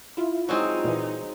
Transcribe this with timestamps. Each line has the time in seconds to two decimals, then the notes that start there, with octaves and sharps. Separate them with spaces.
0.17 E4 F4
0.49 F#3 G#3 C4 D#4
0.84 A#2 E3